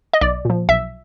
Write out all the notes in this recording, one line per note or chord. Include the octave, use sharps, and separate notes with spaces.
D#5
B1 D5
A#2 F3
B1 E5